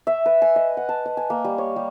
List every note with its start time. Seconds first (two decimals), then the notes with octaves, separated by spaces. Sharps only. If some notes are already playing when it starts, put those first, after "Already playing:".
0.07 E5
0.26 B4
0.42 G#5
0.56 D#5
0.77 F#5
0.89 A5
1.05 D#5
1.17 G#5
1.30 A#3
1.44 G3
1.58 C#5
1.76 G3